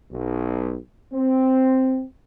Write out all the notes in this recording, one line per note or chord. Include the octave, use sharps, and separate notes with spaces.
B1
C4